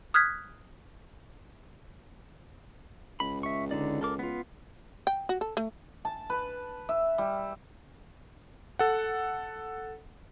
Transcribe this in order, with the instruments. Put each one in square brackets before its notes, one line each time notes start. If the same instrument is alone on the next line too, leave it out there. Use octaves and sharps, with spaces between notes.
[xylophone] D#6 F6 F#6 G#6 B6
[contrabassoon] C#2 [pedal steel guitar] B5
[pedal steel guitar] E5 C#6
D3 D#4 D5
A4 A#4 D6
B3 F4
[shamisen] G5
F#4
A4
A3
[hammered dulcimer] A5
B4
E5
G3
[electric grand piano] A4 F#5